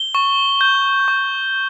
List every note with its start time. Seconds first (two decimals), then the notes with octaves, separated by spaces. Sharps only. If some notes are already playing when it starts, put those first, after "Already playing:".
Already playing: G7
0.15 C#6
0.61 G6
1.08 C#6